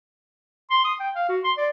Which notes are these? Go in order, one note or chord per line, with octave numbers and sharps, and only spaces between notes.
C6
D#6
G5
F5
F#4
C6
D5